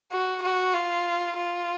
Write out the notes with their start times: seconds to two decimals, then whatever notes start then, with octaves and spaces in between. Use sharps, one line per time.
0.11 F#4
0.43 F#4
0.73 F4
1.37 F4